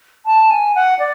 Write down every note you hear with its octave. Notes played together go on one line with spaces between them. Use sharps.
A5
G#5
F#5
D5